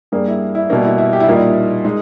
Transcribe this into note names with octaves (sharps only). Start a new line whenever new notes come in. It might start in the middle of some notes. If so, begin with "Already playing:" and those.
G2 G3 A#3 G#4
E4
E4
B2 G3 A#3 E4
E4
E4
G4
E4
A#2 G3 A#3 D#4
E4
G#3 D#4